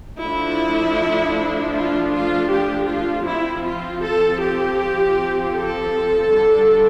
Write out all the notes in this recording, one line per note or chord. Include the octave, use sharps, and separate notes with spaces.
F3 A3 D4 E4
F4
F4
G4
F4
F3 C4 E4
F4
A4
G4
A4
D3 G3 D4